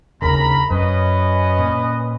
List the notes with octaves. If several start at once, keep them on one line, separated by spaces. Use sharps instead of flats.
D#2 C#3 A#4 A#5 B5
F#2 C#4 B4 D#5
A#2